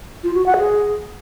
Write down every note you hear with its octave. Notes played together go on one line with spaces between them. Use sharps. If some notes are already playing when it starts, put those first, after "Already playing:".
F4
F#4
F#5
G#4